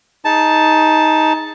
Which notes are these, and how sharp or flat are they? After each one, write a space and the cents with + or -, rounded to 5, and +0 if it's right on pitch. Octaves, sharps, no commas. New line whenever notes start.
D#4 +15 G#4 +0 A5 +0